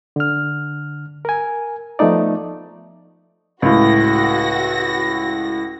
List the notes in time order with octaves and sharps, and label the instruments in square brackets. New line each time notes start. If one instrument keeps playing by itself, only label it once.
[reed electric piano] D3 F6
A#4 G#5
F3 A3 B3 D#4 D5
[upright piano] C#2 A2 [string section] F#4 A#6